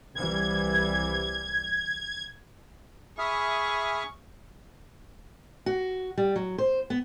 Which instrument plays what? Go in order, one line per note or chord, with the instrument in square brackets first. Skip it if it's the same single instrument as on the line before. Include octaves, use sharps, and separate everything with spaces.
[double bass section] C2 E3 G3 [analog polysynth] G#6
[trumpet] G#4 [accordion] E5 D#6 F6 [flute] B5 [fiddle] C#6
[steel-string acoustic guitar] F#4
G3
F#3
C5
B3